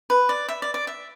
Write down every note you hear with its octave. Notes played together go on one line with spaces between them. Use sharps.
B4
D5
E5
D5
D5
E5